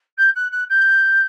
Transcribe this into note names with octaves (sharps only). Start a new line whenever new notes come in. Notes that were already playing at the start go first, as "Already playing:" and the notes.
G6
F#6
F#6
G6